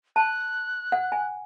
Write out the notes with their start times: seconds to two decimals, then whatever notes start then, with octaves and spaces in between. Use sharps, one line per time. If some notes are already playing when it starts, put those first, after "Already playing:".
0.16 A5 F#6
0.92 F#5
1.12 G#5